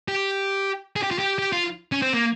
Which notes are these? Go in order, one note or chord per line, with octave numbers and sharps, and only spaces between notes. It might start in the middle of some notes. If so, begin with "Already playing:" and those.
G4
G#4
G4
F4
G4
G4
F4
C#4
C4
A#3